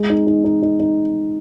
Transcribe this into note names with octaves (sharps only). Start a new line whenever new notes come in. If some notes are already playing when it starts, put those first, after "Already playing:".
Already playing: G#3
D#4
D#4
D#4
D#4
D#4